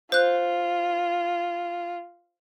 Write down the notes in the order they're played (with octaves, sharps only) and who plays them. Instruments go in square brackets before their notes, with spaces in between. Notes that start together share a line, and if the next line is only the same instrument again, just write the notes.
[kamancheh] F4 [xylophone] C5 F#6